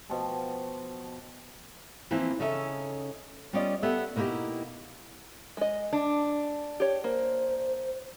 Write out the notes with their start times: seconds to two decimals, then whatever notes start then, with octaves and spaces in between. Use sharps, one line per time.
0.10 B2 F3 G5 A5
2.11 E3 F3 A#3 C4 E4
2.40 C#3 C#4 D#4 A4 E5
3.53 G3 B3 C#4 F4 D5 D#5
3.82 B3 G4 A4 E5
4.16 B2 A#3 B3 D#4 E4 G4
5.57 G#3 D#5
5.93 D4
6.80 G4 C#5
7.04 A#3 C5